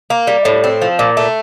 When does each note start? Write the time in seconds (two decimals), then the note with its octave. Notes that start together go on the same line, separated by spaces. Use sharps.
0.10 A#3
0.27 G3
0.45 A2
0.64 C4
0.82 F3
0.99 A#2
1.17 A3